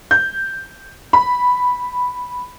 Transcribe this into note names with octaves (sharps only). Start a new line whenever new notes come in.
G6
B5